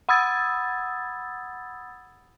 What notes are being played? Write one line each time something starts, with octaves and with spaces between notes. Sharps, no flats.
F#5 B5 D#6 E6 G#6 A6